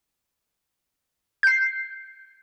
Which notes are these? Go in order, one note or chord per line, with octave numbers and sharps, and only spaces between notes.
G6 C7